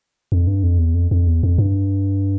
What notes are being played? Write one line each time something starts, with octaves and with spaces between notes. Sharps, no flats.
F2
G2
F2
E2
F2
F2
E2
F2
G2